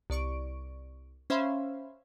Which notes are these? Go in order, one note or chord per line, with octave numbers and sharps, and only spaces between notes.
C2 D5 C#6 D7
C#4 C5 E5 F5 B5 C6